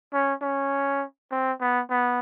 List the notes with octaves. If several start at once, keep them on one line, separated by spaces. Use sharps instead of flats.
C#4
C#4
C4
B3
B3